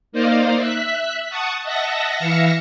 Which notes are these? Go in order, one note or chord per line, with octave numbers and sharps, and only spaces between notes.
A#3 D#4 C5 D5 D#5 F5
E5 F#6 B6
F#5 A5 C#6 D#6
D#5 E5 F#5 A5 A#6
E3 E5 F5 E6 A#6 C#7